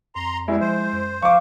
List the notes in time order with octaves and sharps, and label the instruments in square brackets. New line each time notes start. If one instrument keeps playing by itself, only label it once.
[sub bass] F2 [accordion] A#5 C6
[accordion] B2 G3 [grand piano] G#3 E4
[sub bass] F3 [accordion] C5
[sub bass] F#2
[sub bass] F3 [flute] F5 [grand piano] C#6 D6